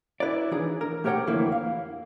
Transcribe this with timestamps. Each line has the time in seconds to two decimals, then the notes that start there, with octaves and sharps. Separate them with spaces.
0.20 E4 B4 C#5 D5
0.51 E3 D4 D#4 G#4
0.81 A#4
1.04 A3 G4 A#4 C#5 F#5 G5
1.27 F2 D3 E3 A#3 E4
1.52 F5